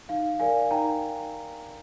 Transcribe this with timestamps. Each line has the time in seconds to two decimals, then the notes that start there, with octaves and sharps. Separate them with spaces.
0.09 D#4 F5
0.39 A#4 D5 F5 G#5
0.71 D#4 G5 A#5